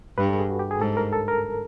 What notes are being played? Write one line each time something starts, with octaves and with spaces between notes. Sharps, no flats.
G2 B4
A4
G#4
F#4
G4
G#4
G#2 A4
A#4
A4
A#4